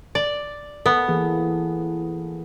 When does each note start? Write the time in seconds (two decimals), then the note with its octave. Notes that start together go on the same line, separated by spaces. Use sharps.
0.15 D5
0.86 B3 A4
1.08 E3 A#3 G#4